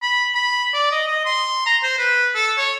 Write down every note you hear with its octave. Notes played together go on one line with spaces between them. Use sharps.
B5
B5
D5
D#5
D#5
C6
A#5
C5
B4
A4
C#5